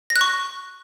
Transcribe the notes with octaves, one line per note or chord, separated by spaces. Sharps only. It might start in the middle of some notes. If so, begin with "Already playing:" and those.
A#6
F#6
C#6